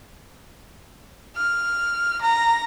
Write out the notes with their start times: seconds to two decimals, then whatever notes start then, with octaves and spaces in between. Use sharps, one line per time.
1.36 F6
2.22 A#5